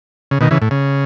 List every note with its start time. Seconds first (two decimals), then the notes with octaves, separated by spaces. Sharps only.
0.31 C#3
0.41 B2 D#3
0.51 C#3 E3
0.62 A2
0.71 C#3